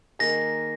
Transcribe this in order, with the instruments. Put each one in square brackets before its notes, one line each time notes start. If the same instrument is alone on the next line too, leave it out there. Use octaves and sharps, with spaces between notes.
[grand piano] D#3 A#3 D#4 G#4 [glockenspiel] A#6